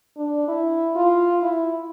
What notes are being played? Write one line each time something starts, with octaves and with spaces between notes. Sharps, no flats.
D4
E4
F4
E4